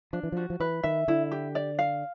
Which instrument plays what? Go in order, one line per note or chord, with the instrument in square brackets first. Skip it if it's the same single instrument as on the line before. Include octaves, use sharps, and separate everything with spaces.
[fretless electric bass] F3 [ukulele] D4
[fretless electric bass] E3
[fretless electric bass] F3 [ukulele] F#4
[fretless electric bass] F3
[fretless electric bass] E3 [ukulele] B4
[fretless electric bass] D#3 [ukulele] E5
[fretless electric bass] D3 [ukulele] E4
[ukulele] G4
D5
F5